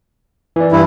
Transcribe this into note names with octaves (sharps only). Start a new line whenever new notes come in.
E3 D5
G2 E4